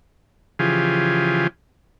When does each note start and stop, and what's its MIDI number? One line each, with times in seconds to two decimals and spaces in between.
0.59 1.47 49
0.59 1.47 52
0.59 1.47 53
0.59 1.47 65
0.59 1.47 67
0.59 1.47 68